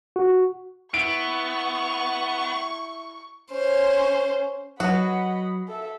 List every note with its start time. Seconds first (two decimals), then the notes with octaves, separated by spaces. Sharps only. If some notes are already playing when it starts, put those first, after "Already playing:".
0.16 F#4
0.94 B3 E4 C#6 D7
3.52 C#4 C5
4.80 F#3 F#4 B4 D#5 F#5 B5
5.68 A4 E5